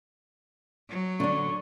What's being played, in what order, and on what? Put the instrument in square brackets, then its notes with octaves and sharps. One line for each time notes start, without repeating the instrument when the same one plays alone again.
[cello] F#3
[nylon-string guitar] D3 D4 [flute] C#6